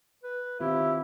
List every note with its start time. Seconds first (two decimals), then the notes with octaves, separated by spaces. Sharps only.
0.24 B4
0.60 D#3 C4 E4 F4 G4